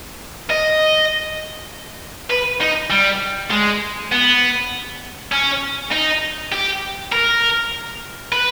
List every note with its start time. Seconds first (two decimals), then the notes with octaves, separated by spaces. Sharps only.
0.50 D#5
2.30 B4
2.61 D#4
2.90 G3
3.51 G#3
4.12 B3
5.32 C#4
5.91 D#4
6.52 G4
7.12 A#4
8.32 B4